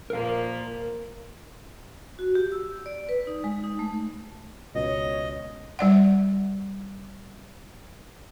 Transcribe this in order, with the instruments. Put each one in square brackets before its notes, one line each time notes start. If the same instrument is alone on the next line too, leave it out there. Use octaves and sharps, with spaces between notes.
[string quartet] A#2 F3 A#3 [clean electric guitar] A#4 F5
[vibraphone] F#4
G4
E6
D5
B4
D#4
G#3
D#4
A3
[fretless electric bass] C#2 B2 [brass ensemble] C#5 [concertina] D#5
[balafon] G3 D5 F#5